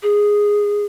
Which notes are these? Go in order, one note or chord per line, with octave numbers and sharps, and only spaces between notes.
G#4